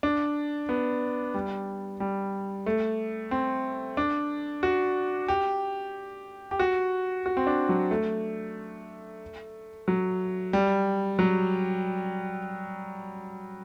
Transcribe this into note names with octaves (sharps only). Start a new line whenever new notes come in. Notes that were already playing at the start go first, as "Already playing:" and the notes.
D4
B3
G3
G3
A3
C4
D4
F#4
G4
G4
F#4
F#4
C4
D4
F#3
A3
F#3
G3
F#3